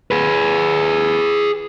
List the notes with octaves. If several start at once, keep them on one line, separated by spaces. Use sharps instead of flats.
G#4 B4